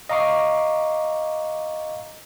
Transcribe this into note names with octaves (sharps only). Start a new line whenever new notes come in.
D#5 F5 A#5 C#6 D6 C7